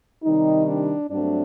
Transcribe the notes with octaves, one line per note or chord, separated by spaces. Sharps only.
C3 D#3 G3 D#4
D4
G2 F#3 A3 C4 D4